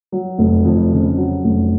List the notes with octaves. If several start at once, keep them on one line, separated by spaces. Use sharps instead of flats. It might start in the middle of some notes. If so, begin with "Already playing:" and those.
F#3
F1
F2
C#3
F#3
F1